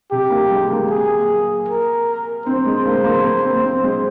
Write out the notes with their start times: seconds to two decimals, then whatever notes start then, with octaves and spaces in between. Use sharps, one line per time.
0.11 C3 G4
0.30 A#3
0.51 G#3
0.70 A#3
0.90 G#4
1.68 A#4
2.46 C4 C5
2.66 G#3
2.85 A#3
3.04 A#3
3.24 A#3
3.44 C4
3.63 C4
3.84 G#3